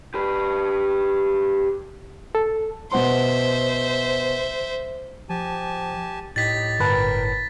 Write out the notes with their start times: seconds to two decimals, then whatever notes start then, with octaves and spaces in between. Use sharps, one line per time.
0.14 G4 B4
2.35 A4
2.92 B2 C5 E5 F#5 C6
5.30 F3 G4 G#5 A5
6.36 A2 D#4 G4 A6 B6
6.80 G1 A#4 B4 G5 A5